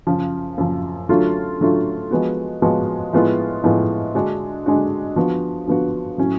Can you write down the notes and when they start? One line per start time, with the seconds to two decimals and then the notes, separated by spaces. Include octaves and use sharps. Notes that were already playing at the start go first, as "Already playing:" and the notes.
0.07 F#2 C#3 F3
0.58 F#2 C#3 F3
1.09 D3 F#3 A3 F4
1.60 D3 F#3 A3 F4
2.11 F3 G#3 B3 F#4
2.62 F3 G#3 B3 F#4
3.13 A2 F3 G#3 B3 F4
3.64 A2 F3 G#3 B3 F4
4.14 D3 G#3 D4 F#4
4.66 D3 G#3 D4 F#4
5.16 D3 F3 B3 F#4
5.67 D3 F3 B3 F#4
6.18 A2 F#3 C#4